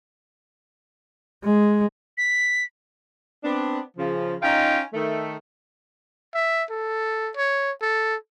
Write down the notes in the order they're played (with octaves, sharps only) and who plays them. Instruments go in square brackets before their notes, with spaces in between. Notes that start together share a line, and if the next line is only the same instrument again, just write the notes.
[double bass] G#3
[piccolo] B6
[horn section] B3 C4 D4
C#3 F3
C#4 D#4 F4 G5 A#5
D#3 A3
[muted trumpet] E5
A4
C#5
A4